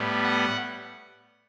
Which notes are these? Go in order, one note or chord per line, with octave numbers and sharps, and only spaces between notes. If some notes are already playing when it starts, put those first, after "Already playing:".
Already playing: A2 G3 B3
F#5